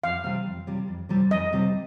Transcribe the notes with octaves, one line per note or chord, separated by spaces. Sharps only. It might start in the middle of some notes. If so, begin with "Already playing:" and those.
F2 F5
C3 G3 C4
F2
C3 G3 C4
F2
C3 G3 C4
F2 D#5
C3 G3 C4